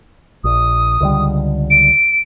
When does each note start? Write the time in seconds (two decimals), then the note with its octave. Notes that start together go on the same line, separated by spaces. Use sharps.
0.44 A#1 D#6
1.01 C#2 D3 G3
1.70 D7